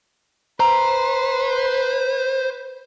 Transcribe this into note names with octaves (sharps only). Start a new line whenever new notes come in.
B4 C5 A#5